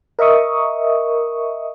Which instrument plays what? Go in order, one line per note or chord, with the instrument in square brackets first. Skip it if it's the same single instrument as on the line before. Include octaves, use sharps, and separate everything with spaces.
[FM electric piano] A#4 D#5 E5 C#6 D#6